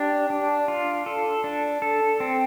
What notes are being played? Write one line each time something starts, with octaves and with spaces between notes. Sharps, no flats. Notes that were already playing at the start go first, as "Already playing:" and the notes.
Already playing: D4 G4
D4
F4
A4
D4
A4
C4